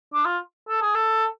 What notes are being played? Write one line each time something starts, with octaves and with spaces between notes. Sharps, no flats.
D4
F4
A4
G#4
A4